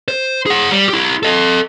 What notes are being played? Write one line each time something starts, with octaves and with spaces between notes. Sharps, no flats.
C5
G#4 F#5
G3
E4 G4
A4 D#5